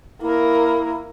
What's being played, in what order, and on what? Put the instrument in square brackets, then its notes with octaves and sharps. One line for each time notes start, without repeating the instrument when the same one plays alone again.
[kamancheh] A#3 A#4 [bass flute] E4